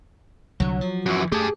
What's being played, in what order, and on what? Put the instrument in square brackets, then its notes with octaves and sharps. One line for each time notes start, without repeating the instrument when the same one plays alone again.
[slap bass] C2 D3 [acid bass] F#3
[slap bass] F3
[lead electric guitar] F#2 E3 [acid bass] F#4
[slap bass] A3 [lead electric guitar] G4 A5 [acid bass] G#4